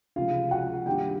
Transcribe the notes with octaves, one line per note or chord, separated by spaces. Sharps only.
C#2 C3 F3 G#3 F4 F5
F#4 F#5
G2 D#3 G3 A#3 G4 G5